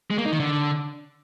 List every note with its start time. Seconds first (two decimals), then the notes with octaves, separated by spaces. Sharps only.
0.11 G#3
0.18 A#3
0.25 D#4
0.33 D#3
0.40 D3